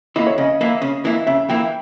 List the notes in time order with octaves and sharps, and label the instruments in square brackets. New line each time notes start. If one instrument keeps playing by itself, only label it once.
[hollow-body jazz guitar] E3 A#3 E4 [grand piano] D#5
[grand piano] C#5
[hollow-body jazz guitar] C#3 [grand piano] D#5
[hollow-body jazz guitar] E3 A#3 E4
C#3
E3 A#3 E4
[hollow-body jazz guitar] C#3 [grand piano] E5
[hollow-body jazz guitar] E3 A#3 E4 [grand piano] G5